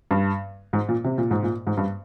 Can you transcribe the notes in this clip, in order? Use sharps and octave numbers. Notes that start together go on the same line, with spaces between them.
G2
G#2
A#2
C3
A#2
G#2
A#2
G#2
G2